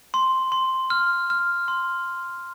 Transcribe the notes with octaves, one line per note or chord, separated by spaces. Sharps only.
C6
C6
F6
F6
C6